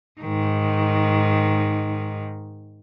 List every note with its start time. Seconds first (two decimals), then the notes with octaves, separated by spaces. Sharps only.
0.21 G#2 D#3